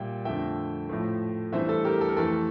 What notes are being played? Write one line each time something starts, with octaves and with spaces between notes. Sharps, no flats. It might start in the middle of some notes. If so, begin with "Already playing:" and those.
Already playing: A#2 G3 E5 G5
F2 D3 F3 A3 E5 G5
A2 F3 A3
G2 E3 A3 C5 E5
A4
G4 A#4
A4
A#4
F2 E3 A3 A4